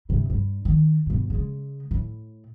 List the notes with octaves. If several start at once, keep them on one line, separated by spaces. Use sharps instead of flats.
G2 C3
G2
D#3
G2 B2
C#3 G#3
A2